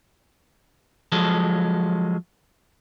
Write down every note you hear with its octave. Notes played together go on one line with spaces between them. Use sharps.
F3 F#3 G#3 A4